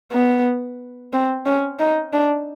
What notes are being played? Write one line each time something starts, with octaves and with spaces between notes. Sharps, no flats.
B3
C4
C#4
D#4
D4